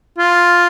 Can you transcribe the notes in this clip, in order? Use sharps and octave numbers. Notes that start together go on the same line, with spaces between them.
F4